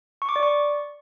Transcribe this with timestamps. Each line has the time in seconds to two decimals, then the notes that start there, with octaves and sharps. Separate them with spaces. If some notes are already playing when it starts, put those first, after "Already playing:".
0.22 C#6
0.29 D6
0.36 D5
0.43 C#6